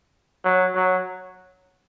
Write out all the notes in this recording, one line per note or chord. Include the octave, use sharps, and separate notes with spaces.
F#3
F#3